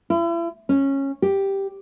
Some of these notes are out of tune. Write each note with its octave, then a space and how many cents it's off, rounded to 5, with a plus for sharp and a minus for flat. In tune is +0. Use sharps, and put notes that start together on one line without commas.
E4 +40
C#4 -15
G4 +0